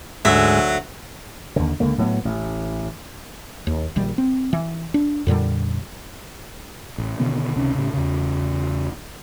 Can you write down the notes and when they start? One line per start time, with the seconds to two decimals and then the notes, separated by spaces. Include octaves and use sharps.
0.25 D2 G#2 F#3 E5
1.56 D#2 D3
1.80 C#2 D3 A#3
1.98 A2 F#3 G#3 B3
2.25 A1
3.67 D#2
3.96 A#1 D#3 G3
4.18 C4
4.53 E3
4.94 D4
5.27 F2 A#2 D3 G3
6.98 A1
7.20 B2 D3 D#3 B3
7.56 C#2 C3 D#3 C#4
7.75 A2 C#3
7.94 E2 C#3